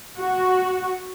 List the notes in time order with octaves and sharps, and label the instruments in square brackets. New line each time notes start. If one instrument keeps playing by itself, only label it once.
[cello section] F#4